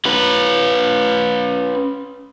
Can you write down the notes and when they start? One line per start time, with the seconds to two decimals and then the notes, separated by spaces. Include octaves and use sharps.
0.05 C#4 B4